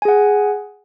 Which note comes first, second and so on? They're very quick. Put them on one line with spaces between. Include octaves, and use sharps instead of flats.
G#5 G#4 F#5